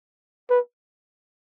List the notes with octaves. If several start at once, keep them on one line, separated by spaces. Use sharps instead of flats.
B4